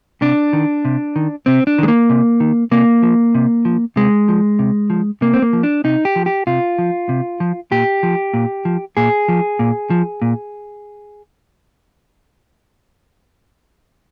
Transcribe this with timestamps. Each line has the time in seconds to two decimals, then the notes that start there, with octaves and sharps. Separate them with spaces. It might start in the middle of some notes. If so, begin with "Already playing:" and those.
0.21 C3 D4
0.53 D#3
0.85 C3
1.16 D#3
1.46 C3 C4
1.67 D4
1.78 D#3 G#3
1.88 A#3
2.10 C3
2.40 D#3
2.71 C3 A#3
3.02 F3
3.35 C3
3.65 F3
3.96 C3 G#3
4.28 F3
4.59 C3
4.90 F3
5.21 C3 A#3
5.34 C4
5.42 A#3
5.53 F3
5.63 D4
5.84 C3 D#4
6.05 G4
6.16 F3
6.26 G4
6.47 C3 F4
6.78 F3
7.09 C3
7.40 F3
7.71 A#2 G4
8.03 F3
8.34 A#2
8.65 F3
8.97 A#2 G#4
9.28 F3
9.59 A#2
9.90 F3
10.22 A#2